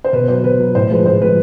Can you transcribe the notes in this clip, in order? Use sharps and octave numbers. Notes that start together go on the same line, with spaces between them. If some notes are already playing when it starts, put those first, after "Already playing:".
C5
B2 B4
F#3 C5
B2 B4
F#3
A2 C5
F3 G#3 B4
A2 C5
F3 G#3 B4